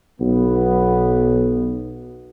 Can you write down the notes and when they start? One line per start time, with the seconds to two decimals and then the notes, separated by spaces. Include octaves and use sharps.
0.20 B1 B3